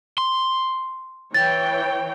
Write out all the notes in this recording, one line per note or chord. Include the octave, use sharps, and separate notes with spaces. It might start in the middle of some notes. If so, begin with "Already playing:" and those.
C6
E3 C#5 G5 A6